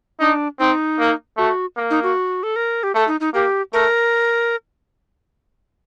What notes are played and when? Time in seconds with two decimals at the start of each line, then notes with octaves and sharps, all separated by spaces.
0.20 D4 D#4
0.60 C4 D#4
0.99 A#3
1.37 A3 F#4
1.77 A#3
1.90 D#4
2.03 F#4
2.43 A4
2.56 A#4
2.83 G4
2.94 A3 A4
3.08 D#4
3.20 D#4
3.34 A#3 G4
3.73 A3 A#4